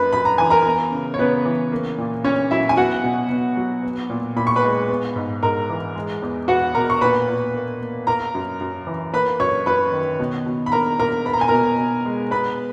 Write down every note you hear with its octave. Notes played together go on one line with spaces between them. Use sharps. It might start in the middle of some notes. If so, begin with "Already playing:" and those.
Already playing: F#2 A#3 B4 B5
F#2 B5
A#5
E3 G#5
A#4 A#5
B3
C#3
C#5
C#3 B3 B4
E3
A#3
A#2
A#2 C#4 C#5
F#3 E4 E5
G#5
B3 F#4 F#5
B2
B2
F#3
B3
A#2
A#2 B5
C#6
B4 B5
G#3
B3
G#2
G#2 A#4 A#5
E3
G#3
E2
B3 F#4 F#5
B2 A#4 A#5
C#6
A#2 B4 B5
A#2
A#3
A#3
A#3 A#4 A#5
F#2
F#2
E3
A#3 B4 B5
F#2 C#5 C#6
F#2 B4 B5
D#3
B2
B2
B5
A#3 A#4 A#5
A#3 A#4 A#5
B3 B5
A#5
G#5
B2 A#4 A#5
B2
G#3
B3 B4 B5